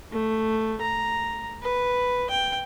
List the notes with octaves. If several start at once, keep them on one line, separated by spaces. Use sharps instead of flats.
A3
A#5
B4
G5